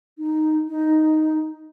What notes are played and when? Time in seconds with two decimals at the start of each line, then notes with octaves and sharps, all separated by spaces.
0.18 D#4
0.68 D#4